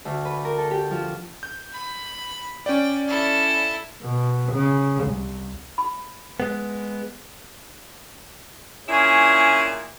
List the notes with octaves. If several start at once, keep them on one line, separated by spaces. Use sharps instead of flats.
D2
B4
A#4
A4
G4
F3
G6
B5
C#4 D5 G5
E4 A4
B2
C#3
C2
B5
G#3 B3
A#2 C#4 D4 E4 G#4